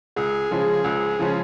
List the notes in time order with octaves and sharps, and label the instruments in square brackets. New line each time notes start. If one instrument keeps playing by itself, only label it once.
[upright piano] C#2 [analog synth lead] G#4
[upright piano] C#3 F3 G#3 C#4
C#2
C#3 F3 G#3 C#4